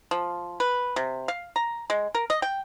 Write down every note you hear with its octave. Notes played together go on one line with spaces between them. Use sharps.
F3
B4
C3
F5
A#5
G#3
A#4
D#5
G5